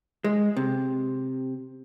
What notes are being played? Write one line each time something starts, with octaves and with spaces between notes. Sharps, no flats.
G#3
C3